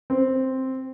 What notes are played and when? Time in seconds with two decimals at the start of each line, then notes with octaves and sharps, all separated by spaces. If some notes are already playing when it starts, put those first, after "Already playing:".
0.10 C4